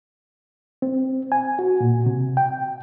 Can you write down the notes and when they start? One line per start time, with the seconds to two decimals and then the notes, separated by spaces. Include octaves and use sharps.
0.82 C4
1.32 G#5
1.59 F#4
1.81 A#2
2.06 C3
2.37 G5